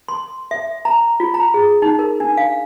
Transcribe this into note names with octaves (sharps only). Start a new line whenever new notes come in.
C6
E5
A#5
F4
A#5
G#4
D#4
A#4
D4
F5